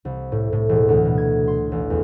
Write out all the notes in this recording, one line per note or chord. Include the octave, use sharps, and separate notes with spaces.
C2
A2
A2
E1
D2
B2
G#6
C6
A1
E2